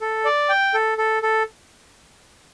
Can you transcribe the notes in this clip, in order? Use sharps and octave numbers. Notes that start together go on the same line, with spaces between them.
A4
D5
G5
A4
A4
A4